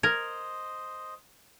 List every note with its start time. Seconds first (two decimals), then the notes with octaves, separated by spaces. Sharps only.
0.03 A#4 C5 D#5 G#6